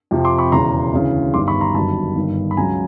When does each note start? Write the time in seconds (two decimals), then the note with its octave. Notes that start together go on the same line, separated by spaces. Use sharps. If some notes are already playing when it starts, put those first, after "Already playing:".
0.11 F2 C3 F3
0.25 C6 D6
0.38 B5 C#6
0.52 E1 E2 C#3 A#5 C6
0.93 D2 C#3 E3
1.34 G1 G2 D#3 G3 C6 D6
1.48 B5 C#6
1.61 A#5 C6
1.75 G1 F#2 D#3 G3 A5 B5
2.16 G1 G2 D#3
2.51 B5
2.57 C#2 C#3 F#3 G#5 A#5